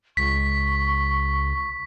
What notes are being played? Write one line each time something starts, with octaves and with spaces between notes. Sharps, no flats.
C#2 C#6 B6